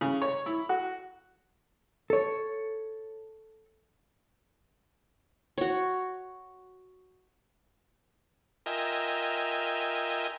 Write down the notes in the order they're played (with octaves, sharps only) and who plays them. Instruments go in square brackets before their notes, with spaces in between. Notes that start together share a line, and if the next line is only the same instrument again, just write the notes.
[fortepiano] C#3
C#5
E4
F#4
[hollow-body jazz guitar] A4 C#5
[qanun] F#4 C#5
[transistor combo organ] F4 A#4 D#5 E5 G5 G#5